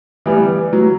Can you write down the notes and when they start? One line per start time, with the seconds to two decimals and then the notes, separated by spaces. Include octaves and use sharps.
0.26 E3 G3 B3
0.73 F#3